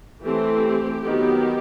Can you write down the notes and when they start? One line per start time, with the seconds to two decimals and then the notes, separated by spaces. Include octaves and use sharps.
0.22 E3 A3 C4 G4
1.04 D#3 F#3 B3